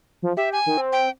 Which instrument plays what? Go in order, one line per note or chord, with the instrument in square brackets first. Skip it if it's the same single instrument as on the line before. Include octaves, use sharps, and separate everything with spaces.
[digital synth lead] F3
[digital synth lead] G4 [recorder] E5
[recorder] G#5
[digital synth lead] D#3
C4
[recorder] G5